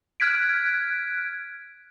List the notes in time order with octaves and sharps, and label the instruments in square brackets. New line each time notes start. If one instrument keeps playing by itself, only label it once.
[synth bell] F6 F#6 G#6 B6 D7